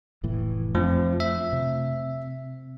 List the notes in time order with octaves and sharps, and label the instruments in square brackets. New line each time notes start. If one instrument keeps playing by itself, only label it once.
[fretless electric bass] F1 A2 E3
[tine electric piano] F2 F3 [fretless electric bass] A3 D4
[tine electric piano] E5
[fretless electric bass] C3